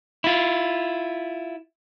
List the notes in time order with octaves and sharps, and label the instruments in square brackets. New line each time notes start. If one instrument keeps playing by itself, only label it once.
[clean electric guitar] E4 F4